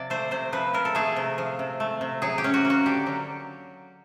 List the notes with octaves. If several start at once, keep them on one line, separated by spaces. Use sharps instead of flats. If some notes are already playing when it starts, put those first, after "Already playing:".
Already playing: C3 F3 D5
A3 C5
C3 C5
F3 B4
C3 A#4
A4
A3 G#4
C3
F3
C3
A3
C3
F#3 G#4
G4
C#4
F#4
A#3
F#4
D3 G4
F#3